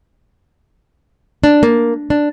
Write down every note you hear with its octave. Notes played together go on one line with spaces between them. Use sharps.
D4
A#3
D4